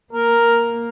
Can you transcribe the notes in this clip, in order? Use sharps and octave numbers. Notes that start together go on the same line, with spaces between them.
A#3 A#4